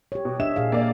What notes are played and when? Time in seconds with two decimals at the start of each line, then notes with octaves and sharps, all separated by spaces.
0.12 G4 C#5
0.25 B2
0.40 D4 D#5 E5 E7
0.56 A#2 G#4 F5
0.72 A#3 D5